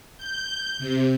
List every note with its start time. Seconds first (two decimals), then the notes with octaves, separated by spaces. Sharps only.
0.17 G6
0.79 C3